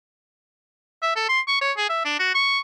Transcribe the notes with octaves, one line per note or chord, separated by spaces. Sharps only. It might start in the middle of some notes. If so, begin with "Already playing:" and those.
E5
A4
C6
C#6
C#5
G#4
E5
D4
F#4
C#6